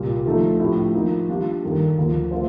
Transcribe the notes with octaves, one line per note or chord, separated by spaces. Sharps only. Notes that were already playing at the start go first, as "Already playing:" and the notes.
Already playing: C2 A#2 G3 A#3
D3 F3 A3 D#4 A4
A2 F3 A3 D4 G4
F3 A#3 D#4
G3 D4 F4
G2 D#3 A#3 D#4 A4
D2 D3 F3 A#3
A3 D4 F4 C5